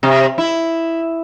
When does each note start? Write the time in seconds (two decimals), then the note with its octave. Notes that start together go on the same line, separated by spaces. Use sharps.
0.03 C3
0.38 E4